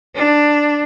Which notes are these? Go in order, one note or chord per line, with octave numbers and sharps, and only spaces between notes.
D4